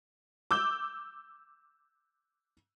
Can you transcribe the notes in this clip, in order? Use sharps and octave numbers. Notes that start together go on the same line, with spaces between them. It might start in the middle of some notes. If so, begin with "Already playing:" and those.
D6 E6 G6